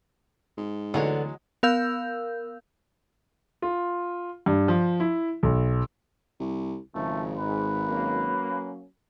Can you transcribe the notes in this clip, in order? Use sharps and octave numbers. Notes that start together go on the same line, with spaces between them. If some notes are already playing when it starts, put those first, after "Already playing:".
G#2
D2 D3 E3 F#3 G#3 B3 C#5
B3 A#4 F5 E6 G6
F4
G2
F3
E4
B1
C2
G#1 C#3 F3 A3
G#2 B4
F#3 A#3 C#4